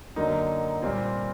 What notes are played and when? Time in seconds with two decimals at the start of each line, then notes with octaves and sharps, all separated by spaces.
0.16 F#2 D3 F#3 A#3 D#4
0.82 A#2 G3 C4 F4